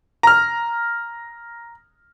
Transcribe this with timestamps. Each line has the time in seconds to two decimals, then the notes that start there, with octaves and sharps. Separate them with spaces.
0.23 A#5 F6